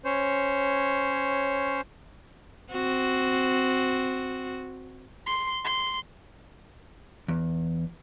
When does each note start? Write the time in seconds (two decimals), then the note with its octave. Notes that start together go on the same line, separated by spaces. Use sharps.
0.05 C#4 C5 C#5
2.73 C4 F#4
5.26 C6
5.64 C6
7.28 E2